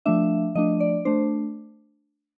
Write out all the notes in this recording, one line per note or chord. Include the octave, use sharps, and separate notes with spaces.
F3 A3 D4 E5
F3 A3 D4 D#5
D5
A3 D4 C5